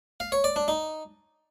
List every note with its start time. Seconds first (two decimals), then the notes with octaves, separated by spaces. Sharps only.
0.20 F5
0.32 C#5
0.44 D5
0.56 D4
0.68 D#4